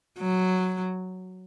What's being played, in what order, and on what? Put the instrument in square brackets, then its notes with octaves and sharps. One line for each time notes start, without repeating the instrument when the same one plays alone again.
[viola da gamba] F#3